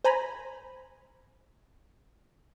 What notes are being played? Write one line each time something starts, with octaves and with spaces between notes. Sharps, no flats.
C5 G#5 A#5 B5